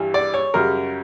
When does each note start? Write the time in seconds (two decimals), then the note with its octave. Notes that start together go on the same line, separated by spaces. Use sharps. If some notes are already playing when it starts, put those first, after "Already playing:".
Already playing: G2 E3 G3
0.14 D5
0.34 C#5
0.54 F#2 C#3 G3 A#4